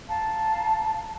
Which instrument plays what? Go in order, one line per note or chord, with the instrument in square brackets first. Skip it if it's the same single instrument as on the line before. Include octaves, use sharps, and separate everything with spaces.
[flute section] F5 A5 A#5